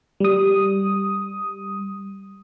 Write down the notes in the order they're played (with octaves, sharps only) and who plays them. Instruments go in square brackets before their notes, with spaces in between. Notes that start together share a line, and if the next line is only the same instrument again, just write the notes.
[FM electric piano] G3 D#6